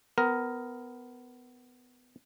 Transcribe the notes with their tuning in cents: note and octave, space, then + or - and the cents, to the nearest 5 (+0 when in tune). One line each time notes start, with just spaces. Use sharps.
B3 +20 A#4 +5